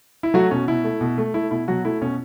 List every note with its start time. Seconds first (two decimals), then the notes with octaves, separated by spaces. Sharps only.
0.23 E4
0.34 F#3 A3 F#4
0.51 B2 C#4
0.68 B2 E4
0.84 A3
1.01 B2
1.18 A3
1.34 A3 E4
1.51 B2 E4
1.68 B2 F#3 F#4
1.85 A3 E4
2.01 B2 C#4